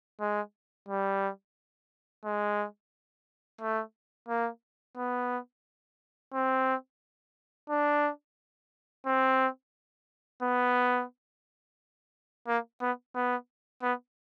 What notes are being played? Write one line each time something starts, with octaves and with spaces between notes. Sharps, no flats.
G#3
G3
G#3
A3
A#3
B3
C4
D4
C4
B3
A#3
B3
B3
B3